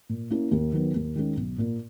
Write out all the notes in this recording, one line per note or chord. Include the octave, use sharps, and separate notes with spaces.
A#2
A#3 C#4 E4
D#2
D#3 F#3 B3
D#2
D#3 G#3 C#4
B1
A#2 A#3